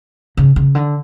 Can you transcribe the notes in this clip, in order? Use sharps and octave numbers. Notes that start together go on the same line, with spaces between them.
C#3
C#3
D3